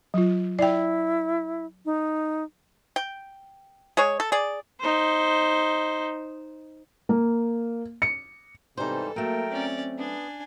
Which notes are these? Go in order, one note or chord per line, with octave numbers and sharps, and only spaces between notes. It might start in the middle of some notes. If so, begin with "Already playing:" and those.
F#3 F4
E4 D5 G5
D#4
G5
G#3 G#4 C#5
A4
G#4 D5
D#4 C5
A#3
C#7
G#2 C3 E3 G3 D#4 A4 C5
F#3 A3 A#3 A#4 G5
C4 C#4 D5
B3 D4 G#5